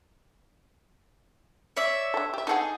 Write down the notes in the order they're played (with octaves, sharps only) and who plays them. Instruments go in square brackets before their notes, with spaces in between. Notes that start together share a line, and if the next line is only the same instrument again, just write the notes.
[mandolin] C#5 D5 E5
[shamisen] D4 A4
G4 E5
[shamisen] D3 A4 F#5 [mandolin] D#4 G#4